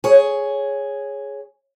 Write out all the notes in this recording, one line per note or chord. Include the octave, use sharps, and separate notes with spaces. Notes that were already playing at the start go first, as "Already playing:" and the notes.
G#4 C#5